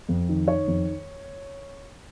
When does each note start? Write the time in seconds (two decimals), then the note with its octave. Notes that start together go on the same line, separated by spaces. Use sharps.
0.09 F2
0.29 D#3
0.48 D#3 C#5
0.68 F2